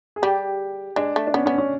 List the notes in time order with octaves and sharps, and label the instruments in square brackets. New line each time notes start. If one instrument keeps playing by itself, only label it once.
[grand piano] G#4
[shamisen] G3 [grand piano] G4
[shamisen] G#3 [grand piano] D4
[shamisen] A3
[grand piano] D4
[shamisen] B3 [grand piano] C#4
[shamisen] B3 [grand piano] C#4
[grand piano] C#4